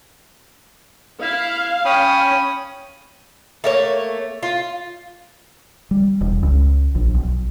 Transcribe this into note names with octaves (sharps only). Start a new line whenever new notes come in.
E4 F5
C#4 C#5 G5 B5 D#6
A3 A#3 C#5
F4
G3
E1
C#2
A#1
B1